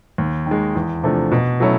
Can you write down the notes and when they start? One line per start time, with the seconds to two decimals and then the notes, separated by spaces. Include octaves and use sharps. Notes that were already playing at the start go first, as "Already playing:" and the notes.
0.18 D#2
0.46 D#3 G#3
0.75 E2
1.03 C3 F3 A3 D4
1.32 B2
1.60 F#3 A3 C#4 E4